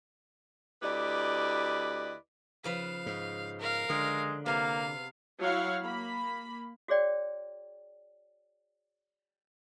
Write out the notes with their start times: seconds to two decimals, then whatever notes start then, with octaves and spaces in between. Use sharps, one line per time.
0.83 D2 E4 G4 B4 D5 D#5
2.64 C#3 F3 B4 F5
3.06 G#2
3.60 A#4 F5
3.90 D3 G#3
4.46 C3 A#3 B3 F5
5.40 F#3 E4 F#4 C#5 F5 F#5
5.83 A#3 B5
6.88 F#4 G#4 C#5 D5 G5